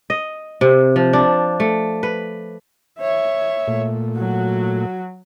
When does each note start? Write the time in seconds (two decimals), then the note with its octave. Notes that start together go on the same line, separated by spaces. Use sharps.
0.10 D#5
0.61 C3
0.96 F3
1.13 D4
1.60 A3
2.03 B4
2.99 C#5 E5
3.67 A#2 A3
4.17 F#3 F#4